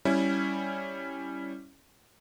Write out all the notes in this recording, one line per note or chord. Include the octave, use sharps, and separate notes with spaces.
G3 C#4 E4